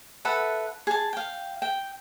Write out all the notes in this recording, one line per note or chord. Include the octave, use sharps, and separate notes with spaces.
A4 B4 E5 F#5
G#4 A5
F5 G5
G5